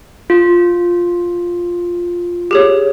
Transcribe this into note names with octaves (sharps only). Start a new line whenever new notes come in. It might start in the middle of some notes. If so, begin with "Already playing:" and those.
F4
G4 G#4 C#5